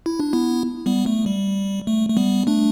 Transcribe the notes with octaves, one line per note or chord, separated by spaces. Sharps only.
E4
D4
B3 E4
G3 B3
A3
G3
A3
A3
G3 B3
A3 D4